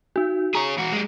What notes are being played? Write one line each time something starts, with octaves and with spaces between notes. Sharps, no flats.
D#4 F#4
G#4 C#5 A#5
E3 F#4
G#3 G4